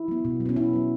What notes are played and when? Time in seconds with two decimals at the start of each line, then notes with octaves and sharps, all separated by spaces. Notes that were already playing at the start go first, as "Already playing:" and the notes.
Already playing: E4
0.08 F#3 B3
0.25 B2
0.40 F#3
0.46 B3 C#4
0.56 B2 E4
0.73 F#3 B3